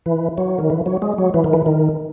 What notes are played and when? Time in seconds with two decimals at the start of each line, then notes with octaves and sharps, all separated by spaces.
0.06 E3
0.38 F#3
0.58 D#3
0.70 E3
0.86 F#3
1.02 G#3
1.18 F#3
1.34 E3
1.44 D#3
1.53 E3
1.66 D#3